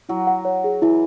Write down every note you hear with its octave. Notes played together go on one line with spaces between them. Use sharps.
F#3 E4
F#5
C#5
G#4
E3 E4